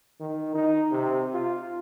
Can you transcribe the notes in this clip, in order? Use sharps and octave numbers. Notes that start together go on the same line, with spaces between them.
D#3
D#4
C3
F4